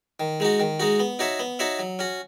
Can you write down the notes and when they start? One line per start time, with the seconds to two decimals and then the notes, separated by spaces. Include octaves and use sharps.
0.20 D#3
0.40 G#3 D#4 F#4
0.60 D#3
0.80 G#3 D#4 F#4
0.99 B3
1.19 D#4 F#4 C#5 E5
1.39 B3
1.59 D#4 F#4 C#5 E5
1.79 F#3
1.99 C#4 F#4